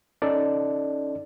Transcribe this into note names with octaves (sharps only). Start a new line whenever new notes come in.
C#4 D#4 A4 D5